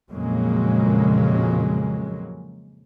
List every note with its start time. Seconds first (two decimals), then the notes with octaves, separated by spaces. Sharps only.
0.11 F2 A#2 C#3 F#3 G#3 A#3